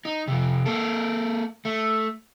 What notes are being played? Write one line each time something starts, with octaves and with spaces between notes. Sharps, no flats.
D#4
C3 F3
A#3 A4
A3